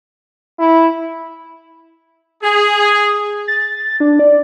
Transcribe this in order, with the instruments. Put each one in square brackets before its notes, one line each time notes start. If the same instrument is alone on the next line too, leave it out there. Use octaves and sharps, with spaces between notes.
[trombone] E4
[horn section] G#4
[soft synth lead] A6
D4
D5